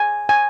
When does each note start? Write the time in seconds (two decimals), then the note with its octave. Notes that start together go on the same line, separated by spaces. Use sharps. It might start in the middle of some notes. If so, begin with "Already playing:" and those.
Already playing: G#5
0.29 G#5